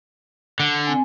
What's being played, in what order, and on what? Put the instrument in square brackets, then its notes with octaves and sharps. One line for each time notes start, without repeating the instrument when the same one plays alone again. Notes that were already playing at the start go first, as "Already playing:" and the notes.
[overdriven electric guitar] D3
[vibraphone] C4 G#5